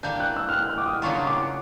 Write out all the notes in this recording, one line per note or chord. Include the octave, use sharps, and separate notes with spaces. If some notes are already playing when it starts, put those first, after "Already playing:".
G3 A#3 D4 G6
F#6
E6
F6
F#6
F6
D6
D#6
C#3 F#3 A#3 D4 F4 C#6
D6